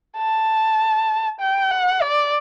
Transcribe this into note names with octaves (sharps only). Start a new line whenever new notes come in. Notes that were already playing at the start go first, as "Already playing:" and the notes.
A5
G5
F#5
D5